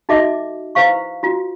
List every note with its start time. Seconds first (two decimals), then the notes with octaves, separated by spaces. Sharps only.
0.09 D#4 F#4 A4 D#5 E5 D6
0.75 E4 B4 C5 F5 C#6
1.23 F4 F#4